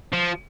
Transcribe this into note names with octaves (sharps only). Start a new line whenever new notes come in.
F3